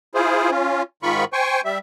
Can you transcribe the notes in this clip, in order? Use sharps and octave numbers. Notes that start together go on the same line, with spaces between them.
E4 F4 G#4 C5
C#4 F4
G#2 D#3 F4 B5 C#6
C5 G5 G#5 C#6
G3 E5